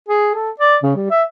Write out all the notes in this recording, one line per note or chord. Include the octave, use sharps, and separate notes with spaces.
G#4
A4
D5
C#3
G3
E5